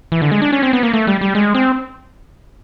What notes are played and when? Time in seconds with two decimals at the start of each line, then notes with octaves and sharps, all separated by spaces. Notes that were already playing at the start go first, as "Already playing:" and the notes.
0.12 E3
0.22 D3
0.32 G#3
0.42 D4
0.52 C#4
0.63 C4
0.73 B3
0.83 A#3
0.94 A3
1.07 G3
1.21 G3
1.35 G#3
1.55 C4